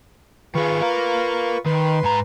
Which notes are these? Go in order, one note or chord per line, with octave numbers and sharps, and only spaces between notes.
D#3 F4 G#4 B4 C#6
A#4 F5
D#3 B4 C6
G#2 A#5